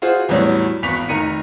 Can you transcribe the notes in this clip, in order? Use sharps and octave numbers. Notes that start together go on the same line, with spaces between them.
F4 F#4 G#4 C5
E2 A2 E3 F#3 G3 C#5
G#1 E2 B4 C#6 B6 F7
F1 D#3 A#5 C#7 D#7